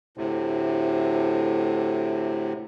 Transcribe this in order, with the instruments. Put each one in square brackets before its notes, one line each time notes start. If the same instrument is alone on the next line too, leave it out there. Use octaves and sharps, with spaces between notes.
[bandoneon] D2 A2 C3